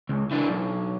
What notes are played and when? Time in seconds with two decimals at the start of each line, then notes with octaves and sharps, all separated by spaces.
0.09 C#2
0.31 E3 D4
0.48 B1